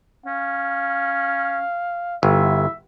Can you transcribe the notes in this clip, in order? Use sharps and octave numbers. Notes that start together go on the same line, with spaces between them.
C#4 F5
G1 E4 E5